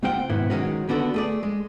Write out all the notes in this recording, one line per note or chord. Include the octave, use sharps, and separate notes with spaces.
C#2 G#3 C4 F4 F#5 G5
B1 G#2 D#3 B3 E4
D#3 F#3 G#3 C#4 F#4
D3 B3 D4 F#4 A4
A3 G#4 D5
G#3